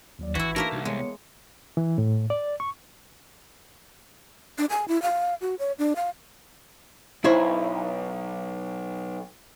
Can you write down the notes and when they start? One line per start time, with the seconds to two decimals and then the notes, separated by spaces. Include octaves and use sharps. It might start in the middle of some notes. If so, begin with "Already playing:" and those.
0.19 D#2 F#3 D5
0.35 G#1 E3 E4 F#4
0.56 A3 A#3 D4 D#4 F#4 A#4 E5
0.72 C2
0.85 G#3 B3 C#5 C#7
1.77 E3
1.98 A2
2.30 D5
2.60 C#6
4.58 D4
4.70 G#5
4.88 E4
5.02 F5
5.41 F#4
5.59 C#5
5.79 D4
5.96 F5
7.25 B1 E4 C5 C#5